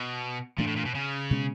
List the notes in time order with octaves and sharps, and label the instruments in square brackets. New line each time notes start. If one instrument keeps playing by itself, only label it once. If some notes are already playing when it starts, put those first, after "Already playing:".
Already playing: [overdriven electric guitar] B2
[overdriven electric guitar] A#2 [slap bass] E3 A3 D4
[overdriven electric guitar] A2
A#2
B2
C#3
[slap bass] B2 G#3 C#4